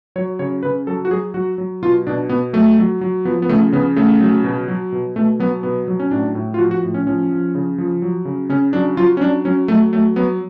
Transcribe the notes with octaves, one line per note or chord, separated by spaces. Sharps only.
F#3 C#5
C#3 C#5
C#3 B4
F#3 A4
F#4
F#3 G#4
F#3 F#4
F#3
B2 F4
B2 D4
B2 B3
F#3 A3
F#3
F#3
F3 B3
B3
C#3 A3
C#3 B3
C#3 A3
F#3
B2
F#3
B2
B2 A3
F#3 B3
B2 B3
F#3
C#4
A2 D4
A2
F4
F3 F#4
F#4
A2
C#4
F3 C#4
F3
C#3
F3
F#3
C#3
C#3 C#4
F#3 D4
F#3 F4
C#4
F#3 D4
F#3 C#4
F#3 A3
F#3 A3
F#3 B3